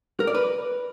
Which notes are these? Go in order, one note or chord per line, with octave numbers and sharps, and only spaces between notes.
A#4
D5
B4